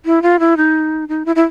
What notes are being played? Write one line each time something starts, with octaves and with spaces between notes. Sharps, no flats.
E4
F4
E4
D#4
D#4
E4
E4